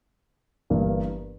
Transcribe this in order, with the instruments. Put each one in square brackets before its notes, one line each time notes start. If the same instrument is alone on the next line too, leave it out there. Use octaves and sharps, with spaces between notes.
[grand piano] G1 G2 E3 G3 A#3